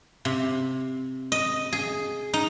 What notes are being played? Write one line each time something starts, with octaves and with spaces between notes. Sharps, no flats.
C3
D#5
G#4
D#4